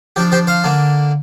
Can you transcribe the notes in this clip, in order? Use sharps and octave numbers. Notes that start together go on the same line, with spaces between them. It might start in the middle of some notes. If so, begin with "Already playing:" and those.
F3 D4 G4
G4 C5
C5 F5
D3 A#3 D4